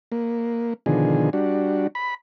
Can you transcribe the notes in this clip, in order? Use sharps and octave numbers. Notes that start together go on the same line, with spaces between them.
A#3
B2 D3 D#3 F3 G#4
G3 D4 F#4
B5